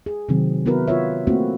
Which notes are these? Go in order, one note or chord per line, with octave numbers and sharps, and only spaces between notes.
G#4
C3 D#3 F#3 C4
B3 E4 F#4 A#4 B4
F4 B4 C#5 E5
A3 A#3 C4 E4 F#4